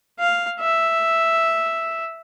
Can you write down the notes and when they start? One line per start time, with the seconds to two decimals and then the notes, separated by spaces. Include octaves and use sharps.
0.19 F5
0.60 E5